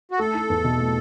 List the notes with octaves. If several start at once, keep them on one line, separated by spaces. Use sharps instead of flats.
F#4
A3 A4
E4
E2
B2
A3